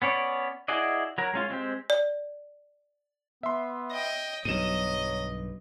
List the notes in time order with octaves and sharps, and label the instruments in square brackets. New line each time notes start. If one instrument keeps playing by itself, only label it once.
[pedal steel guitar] B3 C#4 C#5 D5
E4 F#4 G#4 D5 D#5
F#3 A#4
G#3 C#4 F4
G#3 C4 G4
[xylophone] D5
[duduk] B3 [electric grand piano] E5 C6
[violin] D#5 G5
[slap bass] B1 G2 [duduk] F#3 [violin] D#5 [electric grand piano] D#7 E7